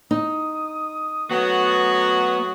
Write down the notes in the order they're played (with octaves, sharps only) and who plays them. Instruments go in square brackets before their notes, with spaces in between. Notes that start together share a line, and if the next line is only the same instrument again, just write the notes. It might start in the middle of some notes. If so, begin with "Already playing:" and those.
[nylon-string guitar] D#4 [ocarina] D#6
[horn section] F#3 A3 F#4 [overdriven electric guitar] B3